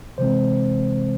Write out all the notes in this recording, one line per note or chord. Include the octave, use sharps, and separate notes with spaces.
C3 E3 G#3 C4 C5